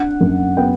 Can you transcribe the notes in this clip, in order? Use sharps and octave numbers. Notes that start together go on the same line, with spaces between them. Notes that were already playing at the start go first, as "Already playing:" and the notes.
Already playing: D4 F#5
F#2
B3 G5